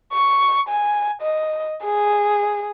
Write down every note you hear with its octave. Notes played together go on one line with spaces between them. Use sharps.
C#6
G#5
D#5
G#4